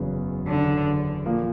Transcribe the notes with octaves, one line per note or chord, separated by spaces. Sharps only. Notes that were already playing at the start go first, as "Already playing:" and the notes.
Already playing: F#1 E2 C#3 F#3 B3
D3
A#2 F3 A#3